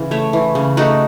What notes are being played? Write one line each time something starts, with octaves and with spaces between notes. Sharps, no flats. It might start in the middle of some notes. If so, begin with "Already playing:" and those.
Already playing: C#3 E3
A3 C#5 E5
E3
C#3
A3 D#4 F#4